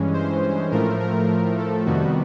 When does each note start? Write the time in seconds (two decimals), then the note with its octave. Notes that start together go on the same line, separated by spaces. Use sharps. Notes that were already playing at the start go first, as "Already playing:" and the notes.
Already playing: G2 E3 G#3 C#4
0.14 C5
0.71 A2 F3 A3 A#4
1.00 A#4
1.58 A4
1.85 F2 C3 D#3 G3 B3 F#4